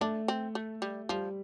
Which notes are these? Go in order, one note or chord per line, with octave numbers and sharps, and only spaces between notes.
A3 D4
C4
A3
G3
F3 G3